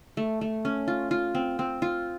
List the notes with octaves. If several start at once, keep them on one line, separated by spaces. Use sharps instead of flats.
A3
A3
C#4
F4
F4
C4
C4
F4